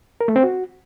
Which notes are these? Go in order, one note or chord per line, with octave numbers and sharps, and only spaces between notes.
A#4
A3
C4
F#4